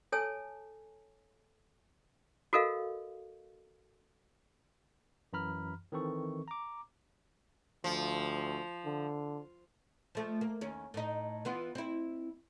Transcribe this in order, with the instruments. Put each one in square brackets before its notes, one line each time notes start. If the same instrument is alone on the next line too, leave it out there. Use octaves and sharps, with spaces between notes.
[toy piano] A4 C#5 G#5 A5 E6
F#4 A4 A#4 D#5 F5
[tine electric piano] F#2 E3 A#5 B5 F6
D#3 E3 C4 A4 C#6
A#5 D6
[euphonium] D2 [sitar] F3
[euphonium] D3
[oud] F3 A3
A#3
D#2 C#4
A2 D#4
E3 B3 F4
C4 E4